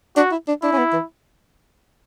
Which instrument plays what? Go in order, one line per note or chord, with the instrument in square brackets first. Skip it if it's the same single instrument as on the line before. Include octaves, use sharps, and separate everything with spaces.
[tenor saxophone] D4 [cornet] F#4
[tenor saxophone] E4
D4
[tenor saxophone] D4 [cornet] E4
[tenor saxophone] C#4
B3
E3